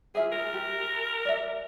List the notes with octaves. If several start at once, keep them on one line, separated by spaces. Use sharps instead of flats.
F4 G#4 E5 G#5
A#4
G4
D5 E5